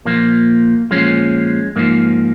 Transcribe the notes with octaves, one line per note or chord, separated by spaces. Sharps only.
A#2 F3 A#3
A#2 F3 G#3 C#4
G#2 F3 A#3 D#4